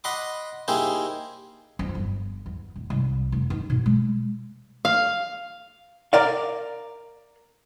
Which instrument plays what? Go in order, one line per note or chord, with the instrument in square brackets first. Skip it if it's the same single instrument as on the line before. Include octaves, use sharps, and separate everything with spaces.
[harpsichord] D#5 F#5 B5 C6 D6
A#3 D#4 E4 G4 G#4 C5
[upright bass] F2
G1
E2
E1
C2
F1
D#4
B2
G#3
[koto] F5
[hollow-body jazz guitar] A#4 D5 F5